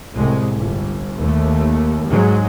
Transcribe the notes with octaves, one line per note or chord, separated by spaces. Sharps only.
C2 A2 G#3
G1
D#2 A3
G#2 F#3 G#3